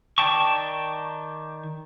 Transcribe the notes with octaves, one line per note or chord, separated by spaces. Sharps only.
D#3 D5 G5 A5 C#6